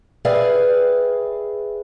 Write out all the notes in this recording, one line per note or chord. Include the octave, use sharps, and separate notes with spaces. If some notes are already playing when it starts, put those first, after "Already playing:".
G#4 B4 D5 E5 F5 G5